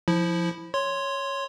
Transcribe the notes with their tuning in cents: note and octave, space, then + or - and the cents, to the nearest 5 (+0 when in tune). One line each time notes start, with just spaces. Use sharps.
F3 +0 E4 -5
C#5 +0 C6 +0